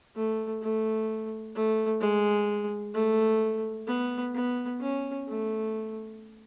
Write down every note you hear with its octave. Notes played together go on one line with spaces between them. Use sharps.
A3
A3
A3
G#3
A3
B3
B3
C#4
A3